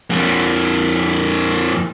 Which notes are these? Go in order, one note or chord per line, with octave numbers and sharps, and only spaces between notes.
F2 A#3